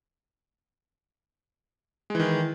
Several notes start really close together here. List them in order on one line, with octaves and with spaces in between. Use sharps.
G#3 E3 D#3